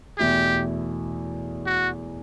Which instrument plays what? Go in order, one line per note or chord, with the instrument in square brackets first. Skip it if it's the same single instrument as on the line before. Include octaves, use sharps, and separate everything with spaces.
[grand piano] E2 B2 A3 E4 [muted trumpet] G4
[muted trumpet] F#4